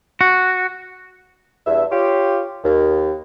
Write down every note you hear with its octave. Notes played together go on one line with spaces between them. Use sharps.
F#4
E2 G2 E5
F4 G4 C#5
D#2